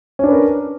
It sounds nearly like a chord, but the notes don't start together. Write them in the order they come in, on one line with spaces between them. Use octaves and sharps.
C#4 D4 B4 A#4